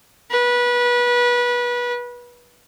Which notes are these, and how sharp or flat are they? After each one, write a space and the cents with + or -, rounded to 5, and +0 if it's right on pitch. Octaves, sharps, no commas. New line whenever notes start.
B4 -25